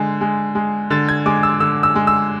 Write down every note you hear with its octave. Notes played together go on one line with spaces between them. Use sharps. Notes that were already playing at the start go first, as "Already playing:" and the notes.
Already playing: D3 G#3
G#3
G#3
D3 A6
G#6
G#3 D6
E6
D3 E6
E6
G#3
E6